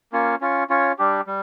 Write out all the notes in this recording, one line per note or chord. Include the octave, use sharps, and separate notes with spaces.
A#3 C#4 F4 C#5
C#4 F4 C#5
C#4 F4 C#5
G3 D4 G4
G3